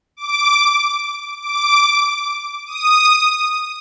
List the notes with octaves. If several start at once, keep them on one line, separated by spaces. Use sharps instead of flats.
D6
D6
D#6